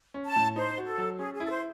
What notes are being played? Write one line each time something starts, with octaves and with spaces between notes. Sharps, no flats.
C#4
A5
A2
D#4 C5
F#4
A4
F#3
C#4 G#4
G#4
E4 A4
C5